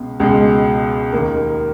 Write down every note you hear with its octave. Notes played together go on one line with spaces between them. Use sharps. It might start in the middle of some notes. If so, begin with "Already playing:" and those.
Already playing: C#2 B2
C#2 B2 G#3
D#2 D#3 A#3 A#4